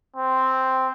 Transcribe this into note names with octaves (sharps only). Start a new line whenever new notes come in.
C4